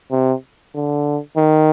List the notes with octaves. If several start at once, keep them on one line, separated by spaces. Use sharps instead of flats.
C3
D3
D#3